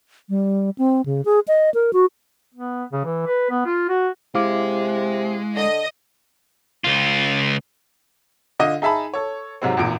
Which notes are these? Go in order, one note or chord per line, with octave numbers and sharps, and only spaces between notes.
G3
C4
C#3
G#4
D#5
A#4
F#4
B3
C#3
E3
B4
B3
F4
F#4
C3 G#3 E4 F5 D6
D3 D#5
C#2 F4
D3 F4 D#5 D#7
D#4 G#4 E5 A5 B5
A4 C#5
G#2 C3 F#3 G#3 C4
G#1 E2 A#2 D7